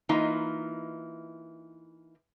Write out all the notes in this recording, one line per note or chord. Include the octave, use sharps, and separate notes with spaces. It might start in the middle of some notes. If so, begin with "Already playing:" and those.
E3 A#3 D#4 F4 D#5